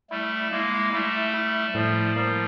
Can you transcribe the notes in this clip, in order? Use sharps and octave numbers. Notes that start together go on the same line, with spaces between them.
G3 A3 E4
G#3 A#3 E4
G3 A3 E4
E4
A2 F3 G3
F3 G3 A#3